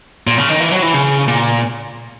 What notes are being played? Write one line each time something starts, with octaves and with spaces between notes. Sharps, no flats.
A#2
C#3
D#3
E3
F#3
E3
C#3
A#2